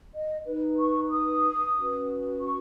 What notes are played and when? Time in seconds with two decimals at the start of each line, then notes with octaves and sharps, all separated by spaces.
0.14 D#5
0.45 D#4 B4
0.78 C#6
1.10 D#6
1.75 C#4 F#4 B4
2.40 C#6